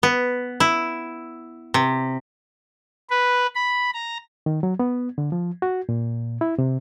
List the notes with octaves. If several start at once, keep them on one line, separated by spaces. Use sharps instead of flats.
B3
E4
C3
B4
B5
A#5
D#3
F#3
B3
D3
F3
F#4
A#2
E4
C3